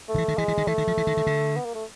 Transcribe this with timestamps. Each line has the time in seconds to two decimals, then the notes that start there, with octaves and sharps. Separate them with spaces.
0.09 A3
0.15 D#3
0.18 E3
0.28 D#3
0.38 E3 G#3
0.48 E3
0.58 D#3
0.67 E3 A3
0.78 D#3
0.88 F3
0.98 E3
1.07 D#3
1.17 D#3
1.27 D3
1.57 B3
1.65 A#3
1.75 A3